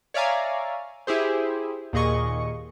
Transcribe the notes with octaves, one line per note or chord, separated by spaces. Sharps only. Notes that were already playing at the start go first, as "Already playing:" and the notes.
C#5 D5 E5 F5 G#5 A#5
E4 G4 G#4 C5
D#2 A#2 G#4 D#5 C#6